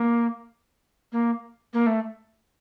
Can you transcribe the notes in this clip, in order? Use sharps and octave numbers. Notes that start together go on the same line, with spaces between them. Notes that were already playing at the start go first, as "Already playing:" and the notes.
Already playing: A#3
A#3
A#3
A3